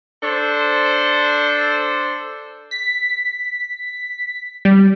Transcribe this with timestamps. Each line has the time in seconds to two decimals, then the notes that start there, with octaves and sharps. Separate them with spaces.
0.22 D4 A4 C5
2.71 B6
4.65 G3